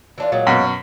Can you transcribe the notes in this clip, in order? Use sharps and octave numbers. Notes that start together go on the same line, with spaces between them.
E3 D4 F4
A#2 F#3 G#3
F#2 B2